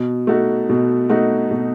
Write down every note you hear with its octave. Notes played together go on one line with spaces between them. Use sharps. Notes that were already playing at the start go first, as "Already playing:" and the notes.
Already playing: B2
A3 D#4 F#4
B2
A3 D#4 F#4
B2